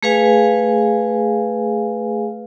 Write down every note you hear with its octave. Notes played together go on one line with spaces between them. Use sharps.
A3 G#4 B4 F5 G#5